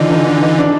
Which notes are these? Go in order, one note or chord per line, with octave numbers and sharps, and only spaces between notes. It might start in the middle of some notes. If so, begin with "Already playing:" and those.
Already playing: D3 E3 D4 D#4 F4
D#4
D4
D#4
D4